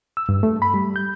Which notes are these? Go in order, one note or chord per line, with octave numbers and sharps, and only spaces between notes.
E6
G2
A3
B5
G3
G6